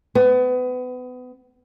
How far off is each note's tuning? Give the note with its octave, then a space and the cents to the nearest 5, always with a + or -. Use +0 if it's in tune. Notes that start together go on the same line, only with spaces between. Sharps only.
B3 +30